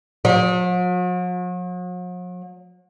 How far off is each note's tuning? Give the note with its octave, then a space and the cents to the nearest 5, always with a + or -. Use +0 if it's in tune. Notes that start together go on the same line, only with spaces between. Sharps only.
F#3 -45